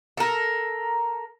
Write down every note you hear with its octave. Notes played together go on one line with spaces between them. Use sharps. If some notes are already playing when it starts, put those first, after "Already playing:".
A4 A#4